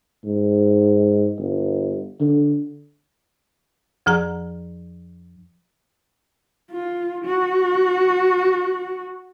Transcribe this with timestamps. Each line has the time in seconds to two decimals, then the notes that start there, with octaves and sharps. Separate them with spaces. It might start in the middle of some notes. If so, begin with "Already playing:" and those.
0.25 G#2
1.39 G1
2.20 D3
4.06 F2 F3 G#4 A#5
6.71 F4
7.25 F#4